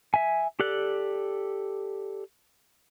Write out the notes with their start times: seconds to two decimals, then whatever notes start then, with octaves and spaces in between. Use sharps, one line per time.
0.14 E5 G#5
0.60 G4 A4 D5 F#6